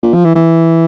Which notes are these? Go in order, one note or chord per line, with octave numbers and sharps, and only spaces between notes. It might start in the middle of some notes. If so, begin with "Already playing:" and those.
A#2
F3
E3
E3